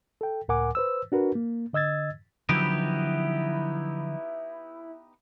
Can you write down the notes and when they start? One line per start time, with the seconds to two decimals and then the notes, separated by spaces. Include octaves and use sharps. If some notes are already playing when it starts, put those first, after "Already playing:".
0.21 A4 G5
0.48 C#2 A2 A#4 F#5 G#5 D6
0.75 B4 C5 E6
1.12 D4 F#4 A#4 B4
1.35 A#3
1.73 D3 D#5 E6 G#6 A6
2.49 D3 F3 F#3 B3 D#4 E4 G4